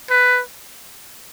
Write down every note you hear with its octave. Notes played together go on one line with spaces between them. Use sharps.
B4